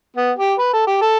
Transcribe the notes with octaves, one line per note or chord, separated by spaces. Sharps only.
B3
G4
B4
A4
G4
A4